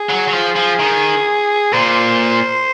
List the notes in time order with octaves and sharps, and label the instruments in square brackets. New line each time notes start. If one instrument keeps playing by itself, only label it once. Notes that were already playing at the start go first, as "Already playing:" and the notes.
Already playing: [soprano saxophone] G#4
[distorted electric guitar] F#3
F#3
F3
F3
D#3
[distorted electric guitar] A#2 [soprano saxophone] C5